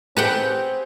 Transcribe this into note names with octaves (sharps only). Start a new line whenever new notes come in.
C4 G4 G#4 B4 F#5 G5